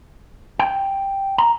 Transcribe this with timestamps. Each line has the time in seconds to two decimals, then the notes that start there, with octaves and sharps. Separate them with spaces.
0.59 G5
1.38 A#5